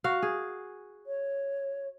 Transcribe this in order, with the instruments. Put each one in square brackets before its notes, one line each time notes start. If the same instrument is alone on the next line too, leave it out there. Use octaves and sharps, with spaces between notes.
[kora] F#4 F5
G#4
[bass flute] C#5